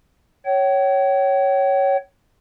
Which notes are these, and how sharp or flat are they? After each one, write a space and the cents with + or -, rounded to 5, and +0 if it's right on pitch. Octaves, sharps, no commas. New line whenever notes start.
C#5 +0 G5 -40